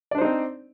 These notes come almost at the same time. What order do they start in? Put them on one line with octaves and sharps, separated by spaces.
D5 D4 C5 D#4 C4